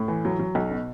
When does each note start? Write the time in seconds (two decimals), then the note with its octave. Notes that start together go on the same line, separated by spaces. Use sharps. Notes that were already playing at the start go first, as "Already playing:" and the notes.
Already playing: A2
0.08 E3
0.25 F#3
0.39 F#3
0.55 B1
0.71 B2